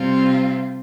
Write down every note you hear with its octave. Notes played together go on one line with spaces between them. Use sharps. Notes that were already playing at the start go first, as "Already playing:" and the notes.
Already playing: C3 G3 C4 F4